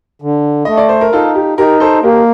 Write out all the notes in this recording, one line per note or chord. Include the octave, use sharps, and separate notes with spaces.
D3
A3 D#5
D5
C5
A#4
D#4 F4 A4
G4
D#4 G4 A#4
A4 C5
A#3 G4 A#4